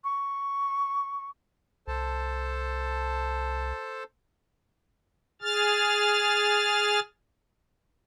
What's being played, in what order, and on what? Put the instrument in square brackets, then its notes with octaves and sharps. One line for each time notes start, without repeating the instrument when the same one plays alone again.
[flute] C#6
[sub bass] C2 [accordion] A4 C5 A5
[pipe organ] G#4 F6 A6